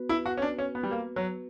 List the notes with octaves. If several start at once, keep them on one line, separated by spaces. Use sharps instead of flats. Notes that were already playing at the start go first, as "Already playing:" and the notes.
Already playing: B3 F#4 B4
E4
F#4
C#4
D4
C#4
B3
G3
A#3
F#3